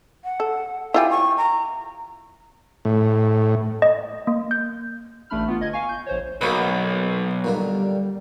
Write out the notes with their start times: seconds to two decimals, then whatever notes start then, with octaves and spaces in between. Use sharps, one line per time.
0.24 F#5
0.40 A4
0.94 E4 F4 G4 G#5
1.11 C#6
1.38 A#5
2.85 A2
3.82 D#5
4.27 A#3
4.51 G6
5.30 A1 A3 D4 B5 F6
5.46 A3 B3 F4
5.60 G1 D#5 G#6
5.73 F5 G#5 C#6
5.89 G6
6.06 A#1 C5 C#5
6.41 B1 A#3 F#4 B4
7.44 A#2 D3 G3 A#3